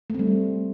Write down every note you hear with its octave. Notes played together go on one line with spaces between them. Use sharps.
G3 A3 C4